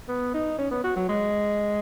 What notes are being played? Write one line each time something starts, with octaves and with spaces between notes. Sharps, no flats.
B3
D#4
C#4
B3
F#4
F#3
G#3